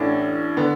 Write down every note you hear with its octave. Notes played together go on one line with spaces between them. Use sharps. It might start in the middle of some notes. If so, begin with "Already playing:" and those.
Already playing: A1 A2 E3 D4
D3 B3